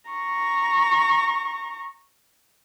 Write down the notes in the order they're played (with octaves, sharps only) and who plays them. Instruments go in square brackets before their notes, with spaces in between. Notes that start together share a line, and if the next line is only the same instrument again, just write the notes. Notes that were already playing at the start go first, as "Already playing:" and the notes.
[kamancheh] A#5 C#6